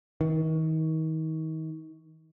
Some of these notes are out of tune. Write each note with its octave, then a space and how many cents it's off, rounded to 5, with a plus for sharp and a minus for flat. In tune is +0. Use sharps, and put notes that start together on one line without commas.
D#3 +35